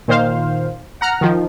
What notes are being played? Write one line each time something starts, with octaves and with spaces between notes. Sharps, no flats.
A#2 D#3 C5 F5
F#5 A#5 F6
D#3 F3